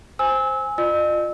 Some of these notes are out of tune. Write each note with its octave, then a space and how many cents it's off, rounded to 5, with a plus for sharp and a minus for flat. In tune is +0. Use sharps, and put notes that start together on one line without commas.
C5 +0 G#5 -5 E6 -25
F4 +0 D#5 -45 E6 -25